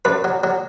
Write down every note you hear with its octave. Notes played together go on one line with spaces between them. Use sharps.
F#2 B4
F#3
F#3